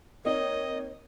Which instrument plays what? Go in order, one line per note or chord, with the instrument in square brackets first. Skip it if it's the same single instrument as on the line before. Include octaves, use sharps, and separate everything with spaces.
[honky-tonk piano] A#3 C4 D#4 [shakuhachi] C#5 [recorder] D#5